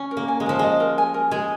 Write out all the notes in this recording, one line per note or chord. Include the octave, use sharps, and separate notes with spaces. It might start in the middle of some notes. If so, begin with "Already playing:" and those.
Already playing: C#4
A#4
A#3
G#5
G#3
F3 A#4
G#3 D#5
A#4
G#5
A#4
G#3 G#4